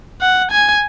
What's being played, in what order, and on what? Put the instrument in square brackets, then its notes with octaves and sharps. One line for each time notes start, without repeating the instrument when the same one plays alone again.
[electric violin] F#5
G#5